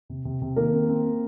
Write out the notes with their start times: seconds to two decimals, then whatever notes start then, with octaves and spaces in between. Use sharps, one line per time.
0.09 C3
0.25 C3
0.42 C3
0.56 D#3 A#3 A#4
0.72 C4
0.89 C4
1.06 C4